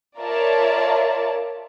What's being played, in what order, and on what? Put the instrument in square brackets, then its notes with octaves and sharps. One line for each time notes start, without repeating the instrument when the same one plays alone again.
[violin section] F4 A#4 C#5 D5 E5 A5